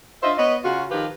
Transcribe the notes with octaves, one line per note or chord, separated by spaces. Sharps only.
D4 F4 C5 D#5 E5
B3 B4 C#5 D#5
C#3 F4 F#4
D#3 F3 G4 B4 F5